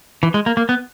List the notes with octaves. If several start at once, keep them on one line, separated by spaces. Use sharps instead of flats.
E3
G#3
A#3
A#3
B3